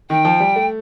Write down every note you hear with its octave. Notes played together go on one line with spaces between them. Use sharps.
D#3 G5
F3
G3
A3